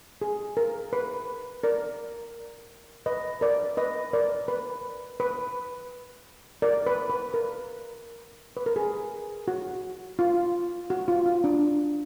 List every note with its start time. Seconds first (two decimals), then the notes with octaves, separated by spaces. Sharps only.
0.22 G#4
0.57 A#4
0.93 B4
1.64 A#4 D5
3.06 B4 D#5
3.41 A#4 D5
3.77 B4 D#5
4.13 A#4 D5
4.48 B4
5.20 B4
6.62 A#4 D5
6.86 B4
7.10 B4
7.34 A#4
8.57 B4
8.66 A#4
8.76 G#4
9.48 F#4
10.19 F4
10.90 F#4
11.08 F4
11.26 F4
11.44 D4